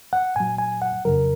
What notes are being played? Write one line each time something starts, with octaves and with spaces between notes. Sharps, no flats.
F#5
A#2 F#3 G#5
G#5
F#5
F2 C#3 F#3 A#4